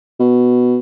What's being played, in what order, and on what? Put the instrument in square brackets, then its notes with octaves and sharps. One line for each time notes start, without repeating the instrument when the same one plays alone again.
[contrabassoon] B2